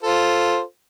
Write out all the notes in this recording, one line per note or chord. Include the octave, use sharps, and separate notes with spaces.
F4 A4 C5